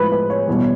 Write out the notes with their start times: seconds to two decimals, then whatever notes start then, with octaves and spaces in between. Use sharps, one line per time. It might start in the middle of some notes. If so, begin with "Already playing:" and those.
Already playing: A2 F3 G#3 B4
0.11 B4
0.30 C#5
0.47 E2 B2 G3